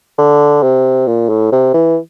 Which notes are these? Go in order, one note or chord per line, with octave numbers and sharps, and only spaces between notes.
D3
C3
A#2
A2
C3
E3